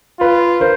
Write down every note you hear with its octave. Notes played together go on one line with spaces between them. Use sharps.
F4 B4
A#4 C5